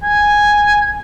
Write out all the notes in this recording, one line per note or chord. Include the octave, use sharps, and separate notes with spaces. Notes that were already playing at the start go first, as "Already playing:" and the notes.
G#5